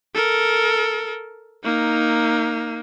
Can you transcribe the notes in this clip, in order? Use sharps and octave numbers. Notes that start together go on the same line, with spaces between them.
A4 A#4
A#3 D#4